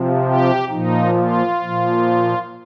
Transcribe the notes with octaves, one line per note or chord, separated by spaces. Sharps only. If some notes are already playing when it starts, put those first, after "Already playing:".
Already playing: C3 F3
G4
A#2 F3 D#4
F4
A#2 F3